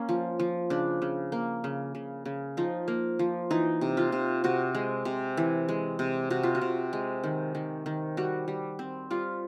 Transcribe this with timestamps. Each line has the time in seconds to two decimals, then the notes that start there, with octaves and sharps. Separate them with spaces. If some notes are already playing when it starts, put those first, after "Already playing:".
Already playing: A#3 C#4
0.09 F3
0.40 F3
0.70 C#3 D4
1.02 C#3
1.32 A#3
1.64 C#3
1.95 C#3
2.25 C#3
2.57 F3 D#4
2.88 A#3
3.19 F3
3.51 E3 D#4
3.81 C3
3.97 F4
4.12 C3
4.44 C3 F#4
4.75 G#3
5.05 C3
5.37 E3
5.69 G#3
5.99 C3
6.30 C3 F#4
6.43 F4
6.55 F#4
6.61 C3
6.93 G#3
7.24 D#3
7.55 D#3
7.86 D#3
8.17 G3 F#4
8.48 G3
8.79 C4
9.11 G3 F4